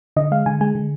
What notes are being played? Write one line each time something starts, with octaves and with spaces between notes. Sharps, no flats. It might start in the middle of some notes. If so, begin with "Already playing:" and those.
D3 D#5
G#3 F5
D3 G#5
G#3 G#5
D3